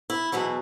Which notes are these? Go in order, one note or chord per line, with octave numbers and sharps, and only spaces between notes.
E4
E2 B2 F#3 E4